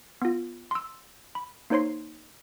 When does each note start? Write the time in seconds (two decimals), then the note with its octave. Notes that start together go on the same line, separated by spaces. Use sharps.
0.22 B3 F4
0.71 C6 E6
1.35 B5
1.70 A#3 D#4 C5 C#5 C6 C7